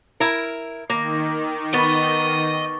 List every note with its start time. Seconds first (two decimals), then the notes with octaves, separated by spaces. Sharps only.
0.20 E4 A#4
0.90 D#3 A#3 D6 A#6
1.74 B3 D#5 C#6 A6 G7